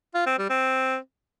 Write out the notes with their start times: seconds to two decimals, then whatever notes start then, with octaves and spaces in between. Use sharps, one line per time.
0.14 F4
0.26 C4
0.38 G3
0.50 C4